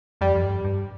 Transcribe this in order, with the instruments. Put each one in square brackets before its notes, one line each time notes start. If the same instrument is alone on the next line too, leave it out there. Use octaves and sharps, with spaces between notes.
[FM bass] F2 [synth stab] G3
[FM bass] F2
G2
G2